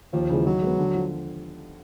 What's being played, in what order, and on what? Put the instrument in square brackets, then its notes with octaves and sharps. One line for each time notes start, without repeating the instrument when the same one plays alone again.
[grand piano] D#2 [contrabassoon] F3
[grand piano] C#3 E3 G#3
[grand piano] D#3 [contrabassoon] F#3
[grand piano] G#3 B3
D3
F3